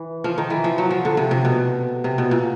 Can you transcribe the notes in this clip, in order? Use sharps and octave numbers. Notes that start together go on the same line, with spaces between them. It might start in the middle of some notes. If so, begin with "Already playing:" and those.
Already playing: E3
F3
D#3
E3
F3
F#3
F3
D3
C3
C3
B2
C3
B2
A#2